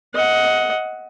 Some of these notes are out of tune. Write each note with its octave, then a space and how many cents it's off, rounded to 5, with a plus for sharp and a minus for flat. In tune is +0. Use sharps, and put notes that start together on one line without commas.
D#5 +20 F#5 +0